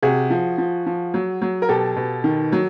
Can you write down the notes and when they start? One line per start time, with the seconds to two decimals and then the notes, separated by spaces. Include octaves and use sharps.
0.02 C3 F#4 G#4
0.30 F3
0.58 F3
0.86 F3
1.14 F#3
1.42 F#3
1.62 A#4
1.69 B2 G4 A4
1.96 B2
2.24 D#3
2.52 F#3